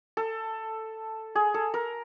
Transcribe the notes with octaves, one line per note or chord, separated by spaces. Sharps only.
A4
G#4
A4
A#4